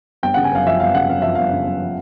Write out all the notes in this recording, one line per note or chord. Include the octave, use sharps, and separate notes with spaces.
G1 G5
C#3 F#5
G#5
F#2 F5
F3 E5
G1 F5
C#3 F#5
F#2 F5
F3 E5
G1 F5
C#3
F#2
F3